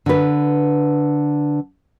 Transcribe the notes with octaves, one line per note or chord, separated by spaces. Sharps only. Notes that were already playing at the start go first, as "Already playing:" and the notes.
D3 B4